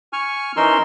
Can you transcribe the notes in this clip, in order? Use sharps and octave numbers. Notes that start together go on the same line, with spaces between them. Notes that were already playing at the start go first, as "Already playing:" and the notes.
G#5 C#6 F6
E3 C#4 D#4 A#4 C6 E6